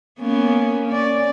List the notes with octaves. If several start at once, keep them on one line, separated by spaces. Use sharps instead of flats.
A#3 B3 C#4
C#4 D5